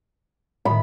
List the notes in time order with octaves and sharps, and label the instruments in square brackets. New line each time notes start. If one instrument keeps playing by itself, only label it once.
[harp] A2 D#3 [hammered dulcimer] B5